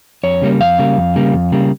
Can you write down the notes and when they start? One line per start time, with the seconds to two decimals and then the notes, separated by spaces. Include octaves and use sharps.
0.23 F2 C#5
0.42 C#3 G3 A#3
0.60 F2 F5
0.79 C#3 G3 A#3
0.97 F2
1.16 C#3 G3 A#3
1.33 F2
1.52 C#3 G3 A#3